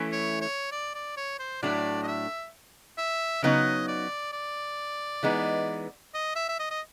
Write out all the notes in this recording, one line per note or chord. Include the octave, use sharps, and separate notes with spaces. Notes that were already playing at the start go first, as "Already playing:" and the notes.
Already playing: E3 A3 C#4 E4
C#5
C#5
D5
D5
C#5
C5
A2 F#3 A3 D4 D5
D#5
E5
E5
C#3 F#3 B3 D#4 D#5
D5
D5
E3 G#3 B3 D#4
D#5
E5
E5
D#5
D#5